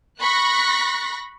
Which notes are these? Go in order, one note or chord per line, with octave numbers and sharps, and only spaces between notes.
B5 C#6 F#6 A#6 B6